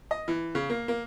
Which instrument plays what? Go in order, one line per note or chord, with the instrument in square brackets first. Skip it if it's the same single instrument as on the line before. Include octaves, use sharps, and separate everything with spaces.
[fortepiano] D#5
E3
C#3
A#3
A#3